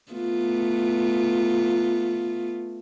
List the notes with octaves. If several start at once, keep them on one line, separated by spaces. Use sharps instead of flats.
A3 B3 F4